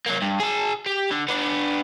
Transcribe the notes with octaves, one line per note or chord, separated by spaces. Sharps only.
F#3 A#3
G2
G#4 A5
G4
D3
B3 D4